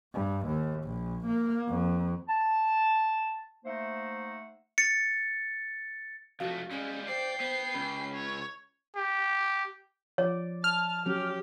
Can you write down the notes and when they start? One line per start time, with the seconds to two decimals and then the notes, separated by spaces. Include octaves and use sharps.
0.14 G2
0.47 D#2
0.84 A#1
1.27 A#3
1.69 F2
2.28 A5
3.65 A3 A#3 D#4 C5 E5 F#5
4.78 A6 C#7
6.40 F2 A3 F#4 F5
6.71 G3 G#3 C#4
7.08 C5 D5 G5 C7
7.40 B3 C5
7.74 C#2 C#4 B5
8.14 C#5
8.96 G4
10.18 F3 C#5 D5
10.64 A5 F6
11.06 F#3 C#4 G4